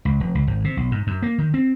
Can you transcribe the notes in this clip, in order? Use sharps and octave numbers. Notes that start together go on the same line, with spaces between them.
C#2
F1
C#2
G#1
C3
B1
G#2
F#2
A#3
D#3
C4